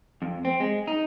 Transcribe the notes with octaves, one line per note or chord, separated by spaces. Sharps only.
F2
C4
G#3
D#4